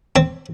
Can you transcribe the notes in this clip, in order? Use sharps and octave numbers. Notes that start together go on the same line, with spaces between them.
C4